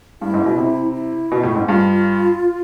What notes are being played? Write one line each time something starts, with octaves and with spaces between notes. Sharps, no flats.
G2 E4
G#2
B2
C3
E4
B2
A2
G#2
G2 F4